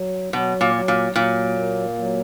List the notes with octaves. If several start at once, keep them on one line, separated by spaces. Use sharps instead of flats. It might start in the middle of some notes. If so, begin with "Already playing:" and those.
Already playing: F#3
B2 F#3
A#2
F#3
A#2
A#2 F#3
A#3
F#3